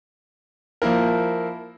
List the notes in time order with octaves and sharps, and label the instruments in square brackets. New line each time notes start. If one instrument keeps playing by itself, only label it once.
[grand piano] F3 A#3 E4 A#4